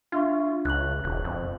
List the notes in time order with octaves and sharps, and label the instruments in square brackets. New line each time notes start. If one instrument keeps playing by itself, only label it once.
[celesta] D4 E5 C#6 [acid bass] F4
[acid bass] C#2 [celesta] F#6 F#7
[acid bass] E1
F2